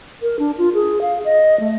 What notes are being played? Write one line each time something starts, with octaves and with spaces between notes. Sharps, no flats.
A#4
D4
F4
G#4
F5
D#5
A3